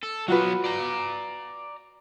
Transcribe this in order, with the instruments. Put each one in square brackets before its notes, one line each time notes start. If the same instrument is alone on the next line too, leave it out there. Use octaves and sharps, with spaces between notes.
[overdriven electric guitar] A4
[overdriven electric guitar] F#3 B3 [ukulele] F4 F#4 B4
[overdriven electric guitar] D5 A#5